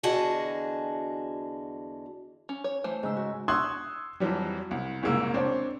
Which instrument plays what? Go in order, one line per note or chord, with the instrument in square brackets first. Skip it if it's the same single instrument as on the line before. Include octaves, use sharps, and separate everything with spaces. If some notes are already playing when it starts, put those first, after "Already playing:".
[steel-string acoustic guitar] E2 D3 F#4 G#4 D#5 A5
[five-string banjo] C#4
C#5
E3 A3 C5
[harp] G#2 C#3 E6
F#4
[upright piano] C6 C#6 D#6 E6 F#6 G#6
F2 E3 F#3 G3
C2
F#1 C2 A#2 G#3 A#3 E6
C4 D4 C#5